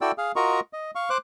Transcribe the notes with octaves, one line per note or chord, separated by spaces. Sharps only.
E4 F#4 A4 D5 G5 E6
G#4 F5
F4 F#4 A#4 D#5 A#5 C#6
D#5
F5 C#6
C5 D6 F#6